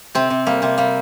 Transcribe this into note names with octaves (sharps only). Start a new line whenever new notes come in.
C3 C4
C3
G3 A#3
C3 C4
G3 A#3